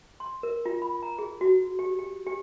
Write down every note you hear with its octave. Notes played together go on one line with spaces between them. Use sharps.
C6
A#4
F4
B5
A#5
G#4
F#4
G4
G4
G4